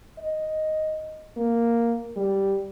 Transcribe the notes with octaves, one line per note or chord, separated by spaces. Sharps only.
D#5
A#3
G3